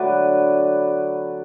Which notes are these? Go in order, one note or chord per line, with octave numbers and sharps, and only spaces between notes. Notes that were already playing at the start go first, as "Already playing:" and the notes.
Already playing: D3 F#3 A3 B4 D5